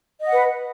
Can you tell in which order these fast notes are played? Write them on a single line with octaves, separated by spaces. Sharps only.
D#5 F#5 B4